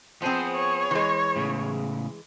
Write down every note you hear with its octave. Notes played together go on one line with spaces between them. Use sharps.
F3 B3 C4 G#4 C5
C#5
E3 G#3
A2 C#3